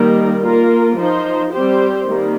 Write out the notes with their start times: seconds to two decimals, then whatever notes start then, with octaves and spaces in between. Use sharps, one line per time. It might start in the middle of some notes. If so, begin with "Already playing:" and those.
Already playing: D#3 G3 A#3 D#4 A#4
0.41 A#3 F4 A#4
0.95 F3 D#4 C5
1.51 G3 C4 G4 C5
2.06 D#3 G3 A#3